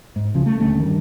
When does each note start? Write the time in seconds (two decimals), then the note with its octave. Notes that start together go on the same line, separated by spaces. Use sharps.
0.16 G#2
0.34 C2 C#3 F3
0.46 A3
0.60 D#1 D2 A3 C#4
0.80 G2 D#3